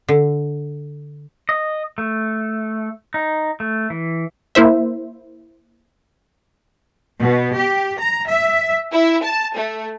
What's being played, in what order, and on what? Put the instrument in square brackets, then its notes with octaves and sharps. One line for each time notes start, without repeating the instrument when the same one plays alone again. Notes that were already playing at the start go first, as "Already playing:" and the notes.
[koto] D3
[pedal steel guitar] D#5
A3
D#4
A3
E3
[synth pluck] A#3 E4 C5 E5
[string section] B2
G4
A#5
E5
E4
A5
A3